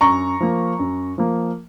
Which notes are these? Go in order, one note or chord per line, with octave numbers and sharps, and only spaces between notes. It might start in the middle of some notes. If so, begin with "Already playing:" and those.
F#2 A#5 C#6
F3 A#3
F#2
F3 A#3